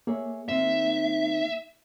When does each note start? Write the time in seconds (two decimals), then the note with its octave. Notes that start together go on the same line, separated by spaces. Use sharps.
0.07 A#3 G#4 C#5 E5
0.49 D#3 C4 D#4 E5